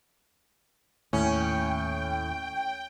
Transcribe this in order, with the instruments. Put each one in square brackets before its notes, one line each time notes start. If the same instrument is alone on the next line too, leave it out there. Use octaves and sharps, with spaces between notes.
[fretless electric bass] D#2 [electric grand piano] A2 [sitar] C#4 [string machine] G5